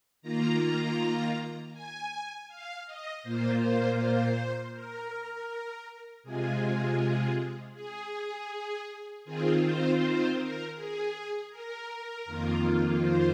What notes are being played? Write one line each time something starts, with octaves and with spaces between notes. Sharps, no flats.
D#3 A#3 F4 A#5
G#5
F5
D#5
A#2 A#3 F4 C5
C5
C5
A#4
C3 G#3 F4 G#4
G#4
D#3 C4 F4 G#4
C5
C5
A#4
G#4
A#4
F2 D#3 A#3 F4
C5